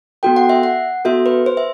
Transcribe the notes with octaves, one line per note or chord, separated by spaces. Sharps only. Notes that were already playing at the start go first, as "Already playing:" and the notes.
B3 F#4 A4 G5
F#5
E5
F#5
B3 F#4 A4 E5
B4
C5
E5